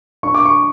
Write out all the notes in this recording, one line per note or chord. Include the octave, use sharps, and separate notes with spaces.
D4 C#6
D6
C#6